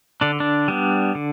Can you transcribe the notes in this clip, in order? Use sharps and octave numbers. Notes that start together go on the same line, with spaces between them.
D3 D4
D4
G3 B3
D3